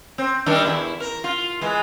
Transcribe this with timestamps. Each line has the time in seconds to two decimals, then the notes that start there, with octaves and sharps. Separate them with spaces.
0.18 C4
0.46 D#3 G3 D4
0.65 E2 E4
1.00 A#4
1.24 F4
1.61 E3 G#3